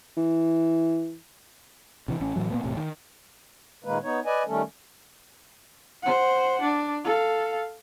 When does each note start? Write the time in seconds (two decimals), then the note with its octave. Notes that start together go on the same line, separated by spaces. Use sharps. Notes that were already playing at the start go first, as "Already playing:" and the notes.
0.17 E3
2.08 C3 D#3 E3
2.20 A1 C#4
2.36 A2 E3 F#3
2.50 A#2 D#3 A#3 B3
2.63 E1 A2 C3
2.77 D#3
3.84 A#2 D#3 G#3 A#3 B4
4.03 B3 D#4 C#5
4.26 B4 D5 D#5 G#5
4.47 D#3 G3 A3 C#4 A4
6.02 C5 F#5
6.61 D4
7.04 A4 F5